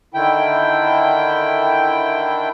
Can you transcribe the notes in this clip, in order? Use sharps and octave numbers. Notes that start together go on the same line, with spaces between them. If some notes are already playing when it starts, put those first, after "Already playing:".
D3 D#3 E4 G5